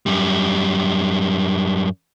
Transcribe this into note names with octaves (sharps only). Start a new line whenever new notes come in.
F#2 G3